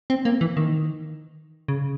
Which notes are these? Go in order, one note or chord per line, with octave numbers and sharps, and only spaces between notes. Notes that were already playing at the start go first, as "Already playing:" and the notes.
C4
A#3
E3
D#3
C#3